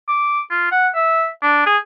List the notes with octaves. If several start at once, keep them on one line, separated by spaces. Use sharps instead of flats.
D6
F4
F#5
E5
D4
G#4